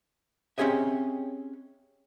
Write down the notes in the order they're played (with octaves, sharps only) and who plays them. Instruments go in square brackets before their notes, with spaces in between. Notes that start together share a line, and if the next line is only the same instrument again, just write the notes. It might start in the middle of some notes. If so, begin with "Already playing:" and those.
[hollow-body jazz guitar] C4 C#4 G4 G#4 D#5 E5